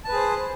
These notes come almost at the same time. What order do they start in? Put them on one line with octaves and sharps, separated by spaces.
A5 B4 G#4 C5